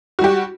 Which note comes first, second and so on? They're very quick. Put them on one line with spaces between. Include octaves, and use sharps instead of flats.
F#4 G3 G4